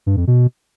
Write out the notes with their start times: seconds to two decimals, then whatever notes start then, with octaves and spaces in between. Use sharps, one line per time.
0.06 G2
0.17 F2
0.27 B2